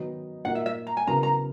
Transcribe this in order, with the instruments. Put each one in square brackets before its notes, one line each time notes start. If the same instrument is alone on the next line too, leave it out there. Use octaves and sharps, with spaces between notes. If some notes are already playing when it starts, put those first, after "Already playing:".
Already playing: [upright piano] D#3 F#3 B3 D#4
[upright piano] A#2 A#3 D#4 F#4 [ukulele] F#5
[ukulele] E5
E5
A#5
G#5
[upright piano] C#3 F#3 B3 E4 A#4 [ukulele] A#5
[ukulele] A#5